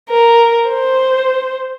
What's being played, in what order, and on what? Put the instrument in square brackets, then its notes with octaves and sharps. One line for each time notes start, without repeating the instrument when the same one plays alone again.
[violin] A#4
C5